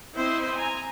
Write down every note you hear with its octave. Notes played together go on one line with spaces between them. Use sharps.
C4 E4 C5 D#5 E5
G#5 A#5